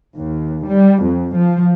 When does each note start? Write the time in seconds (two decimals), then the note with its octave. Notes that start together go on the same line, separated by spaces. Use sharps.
0.16 D#2
0.67 G3
1.04 F2
1.37 F3